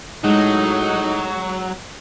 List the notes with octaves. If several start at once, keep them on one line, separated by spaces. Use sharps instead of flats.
A2 F#3 G#3 D#4